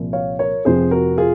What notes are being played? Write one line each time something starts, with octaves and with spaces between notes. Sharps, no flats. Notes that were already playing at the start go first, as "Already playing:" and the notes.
Already playing: C2 A#2 F3 A#3
C#5 F5
A#4 C#5
F1 F2 C3 F3 G#4 C5
F#4 A#4
F4 G#4